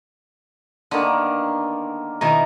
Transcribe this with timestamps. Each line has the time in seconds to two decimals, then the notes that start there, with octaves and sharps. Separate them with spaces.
0.91 D3 D#3 A#3 B3
2.21 B2 D#3 E4 A#5